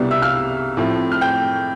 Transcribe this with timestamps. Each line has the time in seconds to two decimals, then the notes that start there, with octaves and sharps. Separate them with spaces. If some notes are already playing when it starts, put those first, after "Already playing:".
Already playing: C2 B2 G3 B3 D4
0.11 E5 E6
0.22 F5 F6
0.77 A2 F3 A3 C4
1.12 F6
1.21 G5 G6